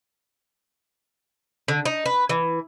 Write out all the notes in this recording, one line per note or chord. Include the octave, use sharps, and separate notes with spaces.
D3
D#4
B4
E3